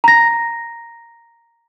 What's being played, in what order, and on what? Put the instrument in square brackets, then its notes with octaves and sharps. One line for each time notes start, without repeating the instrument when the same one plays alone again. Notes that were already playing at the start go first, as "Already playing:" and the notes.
[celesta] A#5 A#6